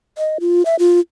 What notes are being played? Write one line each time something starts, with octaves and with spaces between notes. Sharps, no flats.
D#5
F4
E5
F4